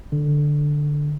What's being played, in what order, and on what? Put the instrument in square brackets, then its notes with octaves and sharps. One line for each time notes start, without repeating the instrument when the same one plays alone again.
[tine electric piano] D3